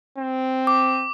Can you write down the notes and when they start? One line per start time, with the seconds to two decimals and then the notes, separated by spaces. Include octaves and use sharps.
0.18 C4
0.67 D6